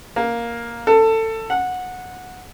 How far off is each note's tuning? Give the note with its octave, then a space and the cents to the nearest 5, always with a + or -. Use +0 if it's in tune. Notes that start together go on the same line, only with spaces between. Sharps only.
A#3 +5
A4 +20
F#5 -15